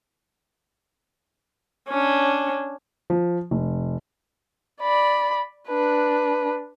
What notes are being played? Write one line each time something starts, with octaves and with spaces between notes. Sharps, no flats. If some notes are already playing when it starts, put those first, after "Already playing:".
C#4 D4
F3
F1
D5 B5
D4 B4